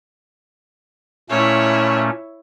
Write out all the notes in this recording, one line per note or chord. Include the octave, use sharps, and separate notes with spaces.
A#2 A3 C#4 E4 C#5